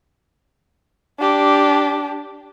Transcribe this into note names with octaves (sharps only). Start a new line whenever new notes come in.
D4 G4